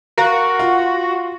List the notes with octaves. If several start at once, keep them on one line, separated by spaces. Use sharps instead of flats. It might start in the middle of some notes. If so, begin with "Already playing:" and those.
F#4 A#4 F5
F4